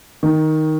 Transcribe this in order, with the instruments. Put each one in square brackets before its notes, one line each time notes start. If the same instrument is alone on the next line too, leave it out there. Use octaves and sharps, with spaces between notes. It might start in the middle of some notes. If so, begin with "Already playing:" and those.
[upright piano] D#3